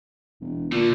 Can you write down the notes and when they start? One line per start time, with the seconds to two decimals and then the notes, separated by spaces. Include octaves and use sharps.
0.41 E1
0.72 A#2 D3 A3